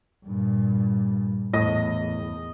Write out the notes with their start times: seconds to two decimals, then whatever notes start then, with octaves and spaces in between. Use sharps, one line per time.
0.25 G2 A#2
1.53 E2 A2 D#5